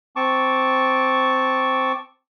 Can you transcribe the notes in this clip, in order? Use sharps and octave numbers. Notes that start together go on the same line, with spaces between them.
C4 A5 C#6 D6